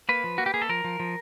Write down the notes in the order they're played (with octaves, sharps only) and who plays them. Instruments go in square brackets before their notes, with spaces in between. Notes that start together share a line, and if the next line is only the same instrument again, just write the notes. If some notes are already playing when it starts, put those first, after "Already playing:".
[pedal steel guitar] A#3 B4
F3
A#3 F#4
G4
A#3 G#4
A4
F3 A#4
F3
F3